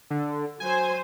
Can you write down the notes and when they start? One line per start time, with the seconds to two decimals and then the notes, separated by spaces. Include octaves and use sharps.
0.10 D3
0.60 F#3 C5 G#5